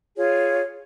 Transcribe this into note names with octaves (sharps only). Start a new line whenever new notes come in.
F4 G#4 C#5